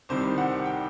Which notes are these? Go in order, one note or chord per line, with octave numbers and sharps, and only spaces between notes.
C2 C3 D#3 G3 C4 C5
F#5
G5